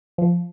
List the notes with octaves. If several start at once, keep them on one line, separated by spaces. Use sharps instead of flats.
F3